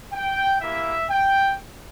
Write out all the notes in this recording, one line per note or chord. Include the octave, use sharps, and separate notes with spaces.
G5
A#3 E4 G4 E5
G5